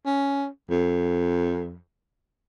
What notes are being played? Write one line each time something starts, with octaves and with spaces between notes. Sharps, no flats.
C#4
F2